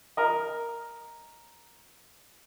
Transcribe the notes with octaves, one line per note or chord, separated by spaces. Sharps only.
A#4 D#5